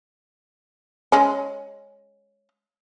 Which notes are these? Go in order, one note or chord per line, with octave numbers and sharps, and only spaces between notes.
G#3 C#4